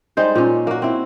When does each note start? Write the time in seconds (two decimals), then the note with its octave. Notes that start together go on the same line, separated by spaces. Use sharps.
0.17 G3 G#3 D#4 C5
0.35 A#2 C#4
0.67 A#3 F#4
0.82 C4 E4